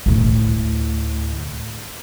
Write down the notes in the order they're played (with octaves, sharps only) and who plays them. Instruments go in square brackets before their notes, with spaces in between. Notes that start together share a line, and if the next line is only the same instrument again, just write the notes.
[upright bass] D2 A2